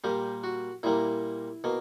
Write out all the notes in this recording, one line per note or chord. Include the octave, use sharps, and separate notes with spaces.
A#2 G3 A#3 G4
F#4
A#2 G3 A#3 E4
B2 A#3